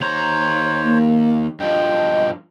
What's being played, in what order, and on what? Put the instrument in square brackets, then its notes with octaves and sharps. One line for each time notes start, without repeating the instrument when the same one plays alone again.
[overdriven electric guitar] D#2 A#5 [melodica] C5 C#5
[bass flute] A#3
[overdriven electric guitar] G2 F3 [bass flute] D#5 [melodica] G5